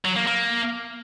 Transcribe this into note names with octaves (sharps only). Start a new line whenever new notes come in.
F#3
A#3
A#3